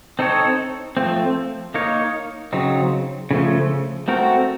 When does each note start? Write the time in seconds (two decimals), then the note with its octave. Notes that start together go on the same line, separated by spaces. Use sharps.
0.19 C4 D#4 A4 C#5
0.97 F3 A3 C4
1.74 A#3 D#4 A#4 C#5
2.53 C#3 F#3 C4 D#4
3.31 C#3 F3 A3
4.08 A3 C4 F#4 A#4